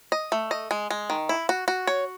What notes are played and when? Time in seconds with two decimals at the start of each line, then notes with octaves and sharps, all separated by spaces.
0.12 D#5
0.32 A3
0.51 D#5
0.71 G#3
0.90 G#3
1.10 D#3
1.29 E4
1.49 F#4
1.68 F#4
1.87 C#5